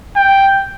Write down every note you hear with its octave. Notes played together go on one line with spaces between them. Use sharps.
G5